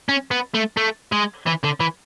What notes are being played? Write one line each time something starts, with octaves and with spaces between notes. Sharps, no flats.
C#4
B3
A3
A3
G#3
E3
D3
E3